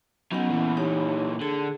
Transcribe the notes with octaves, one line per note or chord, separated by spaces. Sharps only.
F#3 B3 C#4 D#4 F#5
A#2 E3
D#4 G4 C#5
D3 G#4